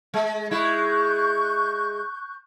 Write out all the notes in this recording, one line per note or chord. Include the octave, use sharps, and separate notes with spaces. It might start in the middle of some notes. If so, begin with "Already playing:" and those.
G#3
G#3 E4 C#6 F#6 G6